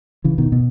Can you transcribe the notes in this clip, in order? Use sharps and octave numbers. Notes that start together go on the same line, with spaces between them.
C#3 E3
B2 D#3
B2